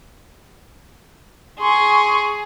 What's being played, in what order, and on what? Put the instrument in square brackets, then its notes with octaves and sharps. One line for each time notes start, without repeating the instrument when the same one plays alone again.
[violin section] G#4 [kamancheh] C6 C#6